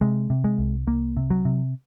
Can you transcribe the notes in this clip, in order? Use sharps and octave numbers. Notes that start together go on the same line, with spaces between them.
C3 G#3
C3
G#3
C2
C2 A#3
C3
F#3
C3